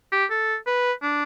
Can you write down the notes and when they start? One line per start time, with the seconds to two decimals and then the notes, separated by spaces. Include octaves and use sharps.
0.12 G4
0.30 A4
0.67 B4
1.02 D4